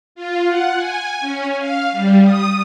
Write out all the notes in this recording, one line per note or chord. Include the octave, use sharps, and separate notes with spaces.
F4
F#5
G#5
C#4
F5
G3
D#6